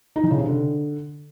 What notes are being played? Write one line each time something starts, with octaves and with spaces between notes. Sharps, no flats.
D#4
E3
C#3
C3
D3